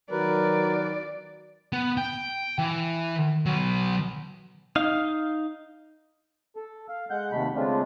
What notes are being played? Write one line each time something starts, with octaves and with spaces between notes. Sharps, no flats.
D#3 F#3 F#4 A#4 B4 D5
B3
G5
E3
F#3 B3
D#4 F5
A4
F5
G#3 F#5 G6
D#2 C3 A3 B5
C#3 G#3 A3 C4 D4 F4